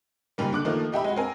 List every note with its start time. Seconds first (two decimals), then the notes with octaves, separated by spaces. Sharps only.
0.38 G#2 C#3 G3 A#3
0.53 D3 D6 F#6
0.65 D#3 F3 A3 A#3
0.92 D#4 G4 E5 B5
1.04 G#3 F#4
1.16 C4 A#4 G#5